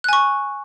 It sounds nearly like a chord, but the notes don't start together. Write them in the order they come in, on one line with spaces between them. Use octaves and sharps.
F#6 G#5 C#6